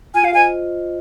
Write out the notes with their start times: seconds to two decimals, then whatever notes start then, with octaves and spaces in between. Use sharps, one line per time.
0.14 F4 G#5
0.24 F5
0.34 C5 D#5 G#5